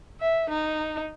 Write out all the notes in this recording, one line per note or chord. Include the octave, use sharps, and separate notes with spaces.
E5
D#4